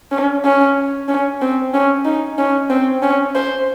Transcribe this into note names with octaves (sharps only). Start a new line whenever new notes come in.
C#4
C#4
C#4
C4
C#4
D#4
C#4
C4
C#4
C5